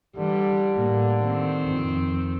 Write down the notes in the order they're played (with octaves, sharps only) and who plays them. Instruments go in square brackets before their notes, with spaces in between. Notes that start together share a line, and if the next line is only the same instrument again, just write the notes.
[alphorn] D3 [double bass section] E3 [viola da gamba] G3
[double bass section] A2 A#3
[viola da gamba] D#3 C4
[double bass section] F2